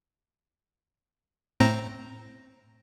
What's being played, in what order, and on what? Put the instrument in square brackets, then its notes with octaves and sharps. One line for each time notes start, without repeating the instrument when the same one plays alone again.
[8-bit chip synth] A2 C4 A#5